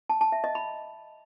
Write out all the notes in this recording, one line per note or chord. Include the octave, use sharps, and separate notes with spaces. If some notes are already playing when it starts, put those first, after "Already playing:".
A5
A5
E5
D#5
B5